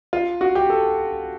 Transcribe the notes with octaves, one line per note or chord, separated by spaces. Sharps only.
F4
F#4
G4
A4